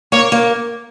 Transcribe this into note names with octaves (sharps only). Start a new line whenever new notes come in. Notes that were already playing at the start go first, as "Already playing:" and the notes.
A#3 C#5
A#3